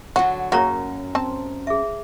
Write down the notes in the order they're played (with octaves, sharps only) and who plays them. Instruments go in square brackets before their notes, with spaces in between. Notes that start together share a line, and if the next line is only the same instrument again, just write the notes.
[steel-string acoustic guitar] D3 F#3 [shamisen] F#4
[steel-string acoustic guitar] F#2 [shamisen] C#3 F#3 A#3 [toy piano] F#4 C#5 A#5
[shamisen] C4 A5
[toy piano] G#4 E5